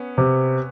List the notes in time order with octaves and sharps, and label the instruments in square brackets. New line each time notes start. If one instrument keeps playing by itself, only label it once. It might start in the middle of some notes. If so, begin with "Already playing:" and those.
Already playing: [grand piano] B3 C#4
[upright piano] C3